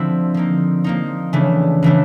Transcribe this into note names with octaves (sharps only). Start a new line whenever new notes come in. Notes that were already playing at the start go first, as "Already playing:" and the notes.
Already playing: D3 F3 A3 C4 E4
F3 A#3 D#4
F3 A#3 D#4
C#3 E3 A3 D4
C#3 E3 A3 D4